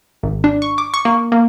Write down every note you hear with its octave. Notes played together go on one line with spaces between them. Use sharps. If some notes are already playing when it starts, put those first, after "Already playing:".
G#1
D4
C#6
D6
C#6
A#3
A#3